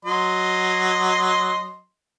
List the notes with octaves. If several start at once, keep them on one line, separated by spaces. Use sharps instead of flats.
F#3 D#5 C6